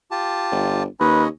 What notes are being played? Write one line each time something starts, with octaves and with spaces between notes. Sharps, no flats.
F4 G4 A5
G1
D#2 C#4 B4 C#5 D#5